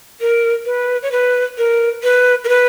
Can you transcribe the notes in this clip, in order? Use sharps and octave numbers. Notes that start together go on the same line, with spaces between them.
A#4
B4
C#5
B4
A#4
B4
A#4
B4